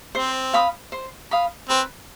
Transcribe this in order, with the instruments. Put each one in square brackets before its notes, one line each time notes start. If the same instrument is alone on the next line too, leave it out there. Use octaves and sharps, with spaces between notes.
[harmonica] C4 [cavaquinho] C5
[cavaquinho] F5 B5 D#6
C5
F5 B5 D#6
[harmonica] C4 [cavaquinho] B4